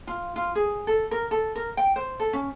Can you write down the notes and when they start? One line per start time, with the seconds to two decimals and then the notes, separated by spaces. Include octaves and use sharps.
0.07 F4
0.36 F4
0.55 G#4
0.87 A4
1.11 A#4
1.31 A4
1.56 A#4
1.77 G5
1.96 C5
2.20 A4
2.33 C#4